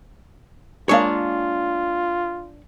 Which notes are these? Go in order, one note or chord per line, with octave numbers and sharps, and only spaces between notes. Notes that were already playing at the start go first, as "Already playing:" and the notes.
G#3 A#3 D4 F4 C#5 F5